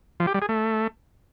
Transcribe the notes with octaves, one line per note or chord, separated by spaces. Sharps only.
F3
G4
G3
G#4
A3